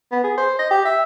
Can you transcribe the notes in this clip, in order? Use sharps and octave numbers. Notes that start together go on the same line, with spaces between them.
B3
G#4
C5
D#5
G4
E5